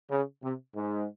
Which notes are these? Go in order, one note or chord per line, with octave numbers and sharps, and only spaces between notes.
C#3
C3
G#2